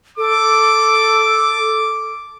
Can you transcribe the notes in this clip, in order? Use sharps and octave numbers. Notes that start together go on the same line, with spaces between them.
A4 D6